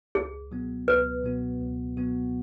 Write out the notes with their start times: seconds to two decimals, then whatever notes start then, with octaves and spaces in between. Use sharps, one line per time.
0.15 C#2 G#4
0.51 B2 F#3 B3 F#4
0.88 C#2 B4
1.24 B2 F#3 B3 F#4
1.61 C#2
1.97 B2 F#3 B3 F#4